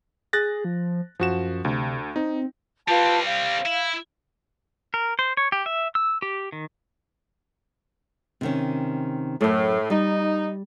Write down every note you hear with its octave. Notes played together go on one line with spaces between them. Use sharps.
G#4 F#6 A6 A#6
F3
F#2 F3 F#4 E7
D2 C3
C4 D#4
G3 C4 F4 B4 A5
F5
E4
A#4
C5
C#5
G4
E5
E6
G4
D#3
C3 D#3 C#4
F#2 A2 A3
G3 D#4